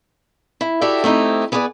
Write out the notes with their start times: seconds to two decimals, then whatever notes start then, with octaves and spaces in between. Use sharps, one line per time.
0.61 E4
0.81 E4 F#4 G4 A4 D5 E5
1.04 A3 C4 D#4 E4 G4
1.52 B3 G#4 B4 C5 D5